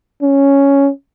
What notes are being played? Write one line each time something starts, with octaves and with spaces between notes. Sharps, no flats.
C#4